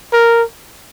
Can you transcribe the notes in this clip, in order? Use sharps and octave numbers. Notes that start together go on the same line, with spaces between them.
A#4